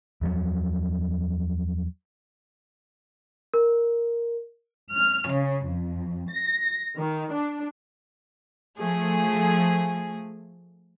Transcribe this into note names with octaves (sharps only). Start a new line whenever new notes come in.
E2 F3 F#3
A#4
F6
C#3
F2
A#6
D#3
D4
F3 A3 G#4